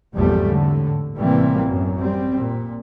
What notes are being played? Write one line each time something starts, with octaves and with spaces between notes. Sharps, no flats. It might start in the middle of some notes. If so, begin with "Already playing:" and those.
G#1 E2 B2 F3 G3 A3
A2 D3
A1 C3 E3 G3 A#3 C4
F#2
G3 C4
A#2